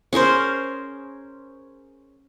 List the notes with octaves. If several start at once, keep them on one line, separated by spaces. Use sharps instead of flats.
C#4 G#4 A#4 C5